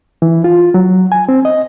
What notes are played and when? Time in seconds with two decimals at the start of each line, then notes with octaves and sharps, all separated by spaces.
0.22 E3
0.44 F4
0.74 F#3
1.12 G#5
1.29 C4
1.45 D#5